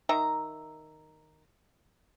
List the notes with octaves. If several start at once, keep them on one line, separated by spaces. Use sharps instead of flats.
D#3 E5 A#5